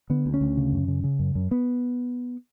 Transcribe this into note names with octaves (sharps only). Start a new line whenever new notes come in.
D3 B3
D2
C#4
D2
C#3
F#2
C#3
C#3
F#2
F#2
B3